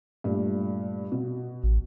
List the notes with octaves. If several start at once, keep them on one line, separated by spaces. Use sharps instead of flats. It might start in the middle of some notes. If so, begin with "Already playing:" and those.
G2 A#2 A3
B2
A1